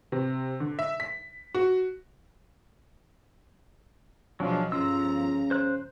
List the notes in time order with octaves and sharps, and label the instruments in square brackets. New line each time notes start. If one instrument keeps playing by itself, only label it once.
[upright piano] C3
D3
E5
B6
F#4
[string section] B2 F3 G#3 [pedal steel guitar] F#3 D4 F4
[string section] G1 F3 A#5 [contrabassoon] C#3 [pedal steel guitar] F4 E6
[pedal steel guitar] C5 F#6